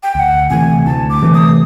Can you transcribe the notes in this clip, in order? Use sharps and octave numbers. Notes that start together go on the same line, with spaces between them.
G5
D2 F#5 G5
C3 E3 A3 G#5
D2 A5
D6
C3 E3 A3
D#6